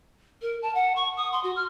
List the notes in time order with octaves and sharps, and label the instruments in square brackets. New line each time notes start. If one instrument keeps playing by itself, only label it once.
[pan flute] A#4
A5
F#5
C#6
D#6
C6
F#4
F6